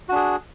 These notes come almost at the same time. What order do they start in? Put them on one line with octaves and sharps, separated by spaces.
F#4 D4 G#4